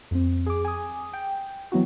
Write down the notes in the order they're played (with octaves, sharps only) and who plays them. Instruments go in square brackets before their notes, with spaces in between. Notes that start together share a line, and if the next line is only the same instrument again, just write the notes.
[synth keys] F2 C4
G#4 D6
G#5 D#6
G5
E3 F#3 B3 E4 F#4